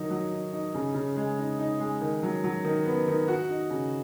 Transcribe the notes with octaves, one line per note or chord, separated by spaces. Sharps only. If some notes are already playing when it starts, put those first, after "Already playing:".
Already playing: D#3 F#3 D#4
F#3
D#4
D#4
C#3
C#3
G#3
D#4
D#4
G#3
D#3
F#3
F#3
D#3
B3
D#3
F#4
D#4
C#3